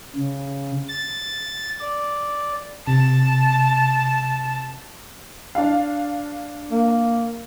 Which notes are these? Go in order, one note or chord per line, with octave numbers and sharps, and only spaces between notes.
C#3
A6
D5
C3 A5
D4 F5
A#3